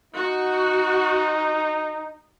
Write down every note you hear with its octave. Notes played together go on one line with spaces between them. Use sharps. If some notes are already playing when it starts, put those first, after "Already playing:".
D#4 F#4